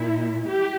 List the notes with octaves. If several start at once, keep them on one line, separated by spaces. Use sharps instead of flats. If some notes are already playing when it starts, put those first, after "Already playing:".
Already playing: A#2 E4
G4